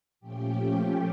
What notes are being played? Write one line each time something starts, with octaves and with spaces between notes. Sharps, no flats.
A#2 F3 A3 C#4 G4 G5